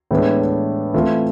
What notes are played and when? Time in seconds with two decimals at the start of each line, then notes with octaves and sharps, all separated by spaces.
0.11 A2 E3 G#3 B3 D4
0.94 E3 A3 C4 F4 A4